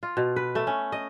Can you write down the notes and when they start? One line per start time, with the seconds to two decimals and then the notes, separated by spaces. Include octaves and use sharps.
0.03 F4
0.17 B2
0.36 B4
0.55 A3
0.67 C#4
0.92 D#5